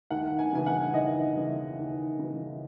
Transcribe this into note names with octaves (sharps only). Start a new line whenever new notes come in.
D#2 F#5
G#5
C#3 E3 G#5
F#5
D#2 D#5
C#3 E3
D#2
C#3 E3